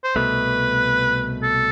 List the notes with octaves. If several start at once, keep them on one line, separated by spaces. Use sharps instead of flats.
C5
C2 B2 A3 B4
A4